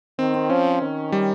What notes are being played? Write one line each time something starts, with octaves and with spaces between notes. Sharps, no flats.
D#3 C4
C4
F3 C#4
D#3
G3